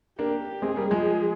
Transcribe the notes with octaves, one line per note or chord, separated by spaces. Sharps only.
A#3 D4 G4
G#3 C4 G#4
G3 A#3
F3 G#3